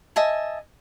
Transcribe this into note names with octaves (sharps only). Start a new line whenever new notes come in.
D#5 E5 G#5 A5